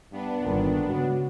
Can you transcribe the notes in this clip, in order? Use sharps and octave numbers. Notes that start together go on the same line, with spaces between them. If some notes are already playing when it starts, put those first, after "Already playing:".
G2 B3 D4
G1 A#2 D#3
C#3 G#3 F#4